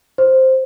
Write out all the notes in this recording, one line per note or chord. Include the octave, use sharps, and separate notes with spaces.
C5